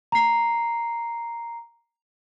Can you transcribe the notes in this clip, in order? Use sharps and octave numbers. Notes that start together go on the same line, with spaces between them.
A#5 C7